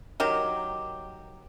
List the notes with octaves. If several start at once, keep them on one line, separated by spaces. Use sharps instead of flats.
D#3 F#3 G4